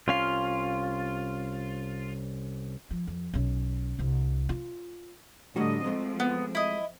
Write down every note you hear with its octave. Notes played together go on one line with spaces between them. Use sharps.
C2 C#4 F4 F5
F3
F2
B1 C#4
C2 D3
F4
A2 D3 F#3 G3 F#4 D#5
F3 F#3 G#3 A3 C4
B3
E4 D#5